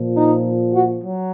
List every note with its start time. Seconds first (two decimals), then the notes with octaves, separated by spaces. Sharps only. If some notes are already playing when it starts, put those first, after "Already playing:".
Already playing: A#2 F3
0.15 D#4
0.73 F#4
1.02 F#3